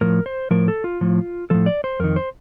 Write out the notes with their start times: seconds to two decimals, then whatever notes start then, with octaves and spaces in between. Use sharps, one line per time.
0.01 A2 F3 A#4
0.26 C5
0.51 A2 F3 A#4
0.68 A4
0.84 F4
1.01 A2 F3
1.50 A2 F3 A4
1.66 D5
1.84 C5
2.00 F2 D#3 A#4
2.16 C5